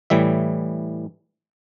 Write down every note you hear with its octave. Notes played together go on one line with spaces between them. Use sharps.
A2 E3 G3 E5